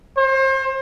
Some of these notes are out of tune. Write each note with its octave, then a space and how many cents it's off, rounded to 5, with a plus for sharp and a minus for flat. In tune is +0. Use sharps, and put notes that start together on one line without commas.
C5 +35